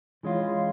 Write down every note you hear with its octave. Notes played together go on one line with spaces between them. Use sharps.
E3 G#3 C#4 F4